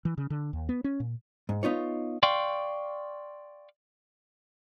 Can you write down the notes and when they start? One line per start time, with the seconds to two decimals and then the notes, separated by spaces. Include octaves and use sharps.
0.05 E3
0.18 C#3
0.30 D3
0.53 D#2
0.69 B3
0.84 C#4
1.00 A#2
1.49 G#2
1.63 B3 D#4 F4 C#5
2.23 D5 F5 G5 C6 C#6